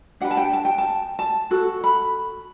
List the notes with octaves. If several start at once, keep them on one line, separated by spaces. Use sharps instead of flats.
D4 G4 B4 F#5
A5
G5
A5
G5
A5
A5
F#4 A4
B5